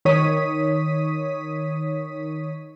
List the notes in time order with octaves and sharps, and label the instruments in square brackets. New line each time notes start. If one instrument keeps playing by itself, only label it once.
[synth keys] D#3 C#5 D#6 B6 D#7